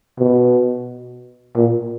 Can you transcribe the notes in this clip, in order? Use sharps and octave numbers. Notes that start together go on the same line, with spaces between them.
B2
A#2